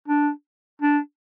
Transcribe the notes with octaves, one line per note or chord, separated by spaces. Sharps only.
D4
D4